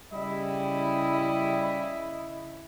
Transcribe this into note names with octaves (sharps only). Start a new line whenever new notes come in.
C#3 G3 E4 D#5